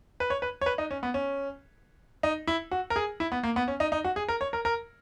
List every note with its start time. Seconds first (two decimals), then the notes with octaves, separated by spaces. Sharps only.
0.20 B4
0.30 C#5
0.42 B4
0.61 C#5
0.66 B4
0.78 D#4
0.91 C#4
1.03 B3
1.14 C#4
2.23 D#4
2.47 E4
2.71 F#4
2.90 A#4
2.96 G#4
3.20 E4
3.32 B3
3.43 A#3
3.56 B3
3.68 C#4
3.80 D#4
3.92 D#4
4.04 F#4
4.16 G#4
4.29 A#4
4.41 C#5
4.53 A#4
4.65 A#4